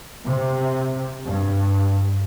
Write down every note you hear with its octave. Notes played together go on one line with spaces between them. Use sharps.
C3
G2